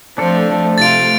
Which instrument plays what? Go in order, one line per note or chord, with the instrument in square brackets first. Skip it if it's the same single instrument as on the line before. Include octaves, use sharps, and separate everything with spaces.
[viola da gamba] F3 C4 [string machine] A3 [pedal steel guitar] D4 A4
[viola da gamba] C3 F4 [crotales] A6 D7